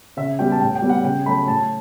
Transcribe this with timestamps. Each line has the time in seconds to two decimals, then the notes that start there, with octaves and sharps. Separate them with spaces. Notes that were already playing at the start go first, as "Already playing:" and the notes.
0.17 C#3 E5
0.39 G3 B3 G5
0.52 A5
0.61 A2 G5
0.75 G5
0.82 G3 B3
0.89 F#5
1.04 C#3 G5
1.26 F#3 A3 B5
1.47 A2 A5